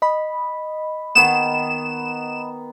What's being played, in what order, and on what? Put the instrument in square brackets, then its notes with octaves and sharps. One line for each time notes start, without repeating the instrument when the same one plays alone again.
[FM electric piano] D#5 B5
[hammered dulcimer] D#3 B3 [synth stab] E7